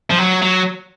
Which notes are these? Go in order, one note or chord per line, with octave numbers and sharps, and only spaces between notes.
F3
F#3
F#3